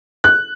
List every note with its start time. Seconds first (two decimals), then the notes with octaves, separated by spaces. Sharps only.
0.24 F#6